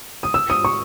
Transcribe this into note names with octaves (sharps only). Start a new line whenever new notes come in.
D#6
E6
D#6
C#6